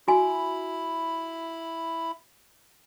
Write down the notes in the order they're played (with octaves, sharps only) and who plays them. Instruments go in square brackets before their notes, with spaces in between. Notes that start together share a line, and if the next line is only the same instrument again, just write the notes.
[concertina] E4 B5 [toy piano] F#4 G#5